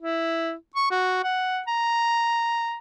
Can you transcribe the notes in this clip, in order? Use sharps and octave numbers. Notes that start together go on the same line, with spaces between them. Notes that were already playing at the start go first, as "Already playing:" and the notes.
E4
C#6
F#4
F#5
A#5